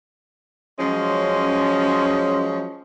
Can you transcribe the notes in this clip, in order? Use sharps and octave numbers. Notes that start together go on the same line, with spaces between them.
F3 F#3 G#3 C#4